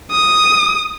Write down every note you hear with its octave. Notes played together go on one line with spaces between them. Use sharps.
D#6